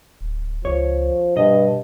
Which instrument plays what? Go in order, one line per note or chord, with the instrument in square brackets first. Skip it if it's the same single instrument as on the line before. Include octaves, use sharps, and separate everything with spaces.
[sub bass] D1
[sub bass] C#2 [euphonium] F3 [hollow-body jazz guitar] C#5
[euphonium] G2 [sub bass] B2 [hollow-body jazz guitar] D#5